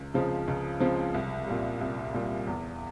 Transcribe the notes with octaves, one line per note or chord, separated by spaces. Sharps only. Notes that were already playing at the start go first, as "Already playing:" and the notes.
Already playing: C#2
C#3 F3 G#3 C4
C#2
C#3 F3 G#3 C4
C2
A#2 G3
C2
A#2 G3
E2